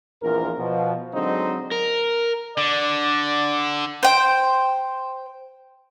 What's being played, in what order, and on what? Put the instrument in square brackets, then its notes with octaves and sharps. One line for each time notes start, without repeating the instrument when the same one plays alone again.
[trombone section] A#1 E2 F3 A#4
B2 F3
D3 F#3 G#3 C4 D#4
[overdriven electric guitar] A#4
[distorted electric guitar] D3 [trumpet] D5
[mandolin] C5 G5